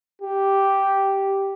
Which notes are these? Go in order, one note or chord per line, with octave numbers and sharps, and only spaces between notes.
G4